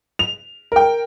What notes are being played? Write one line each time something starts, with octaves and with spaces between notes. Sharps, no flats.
F7
A#4 G5